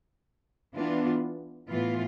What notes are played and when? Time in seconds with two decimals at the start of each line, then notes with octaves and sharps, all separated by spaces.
0.75 E3 B3 D4 F4
1.68 A2 E3 B3 F4